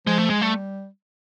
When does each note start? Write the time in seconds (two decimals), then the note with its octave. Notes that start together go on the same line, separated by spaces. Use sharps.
0.07 F3 G#3
0.19 A3
0.30 G#3
0.40 G3 A3